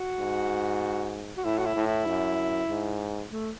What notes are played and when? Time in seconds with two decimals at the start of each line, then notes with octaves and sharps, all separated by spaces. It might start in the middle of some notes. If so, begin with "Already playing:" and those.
Already playing: F#4
0.20 G#2
1.37 F#4
1.44 A2 E4
1.58 F#4
1.66 E4
1.76 A2
1.87 E4
2.07 F#2
2.69 G#2
3.32 A3